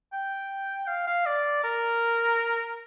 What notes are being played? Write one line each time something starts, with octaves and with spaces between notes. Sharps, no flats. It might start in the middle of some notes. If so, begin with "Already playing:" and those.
G5
F5
F5
D5
A#4